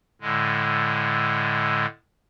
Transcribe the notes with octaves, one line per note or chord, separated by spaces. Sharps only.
A2 D3 G#3